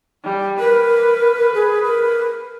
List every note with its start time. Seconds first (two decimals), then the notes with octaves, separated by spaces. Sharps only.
0.24 G3
0.59 A#4 B4
1.54 G#4
1.83 A#4